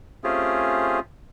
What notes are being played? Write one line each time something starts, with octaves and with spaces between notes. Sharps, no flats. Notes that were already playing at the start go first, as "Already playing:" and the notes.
A3 C4 C#4 F4 G4 G#4